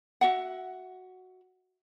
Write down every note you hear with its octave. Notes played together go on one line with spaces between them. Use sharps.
F#4 E5 F#5